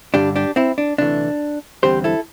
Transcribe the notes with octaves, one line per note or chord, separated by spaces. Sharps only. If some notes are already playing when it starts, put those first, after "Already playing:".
G2 D3 G3 D4 G4
D4 G4
C4 E4
D4
D2 C3 E3 A3 D4
E2 D3 G3 C4 G4 C5
E4 A4